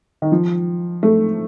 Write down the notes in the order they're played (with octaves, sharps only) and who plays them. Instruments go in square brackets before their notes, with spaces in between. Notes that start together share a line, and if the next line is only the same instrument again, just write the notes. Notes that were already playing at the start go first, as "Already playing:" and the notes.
[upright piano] D#3
F3
A3